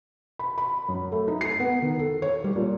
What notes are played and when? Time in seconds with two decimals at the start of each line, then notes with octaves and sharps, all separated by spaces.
0.39 B5
0.58 B5
0.88 F#2
1.12 A3
1.28 D#4
1.41 C7
1.60 B3
1.82 D#3
1.99 A4
2.22 C#5
2.44 G3
2.56 A#2